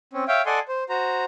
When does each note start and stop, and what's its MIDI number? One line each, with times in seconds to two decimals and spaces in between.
0.13 0.25 60
0.13 0.25 61
0.28 0.42 73
0.28 0.42 76
0.28 0.42 77
0.28 0.42 79
0.46 0.59 69
0.46 0.59 74
0.46 0.59 75
0.46 0.59 78
0.46 0.59 80
0.46 0.59 84
0.68 0.84 72
0.89 1.25 66
0.89 1.25 72
0.89 1.25 82